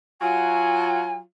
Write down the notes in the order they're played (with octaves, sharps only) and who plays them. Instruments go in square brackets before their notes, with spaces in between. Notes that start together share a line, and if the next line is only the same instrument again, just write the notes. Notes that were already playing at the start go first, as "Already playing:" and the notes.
[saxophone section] F#3 F4 [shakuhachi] G#5